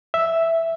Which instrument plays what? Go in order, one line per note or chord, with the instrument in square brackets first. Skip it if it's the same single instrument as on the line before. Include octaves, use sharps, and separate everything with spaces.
[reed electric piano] E5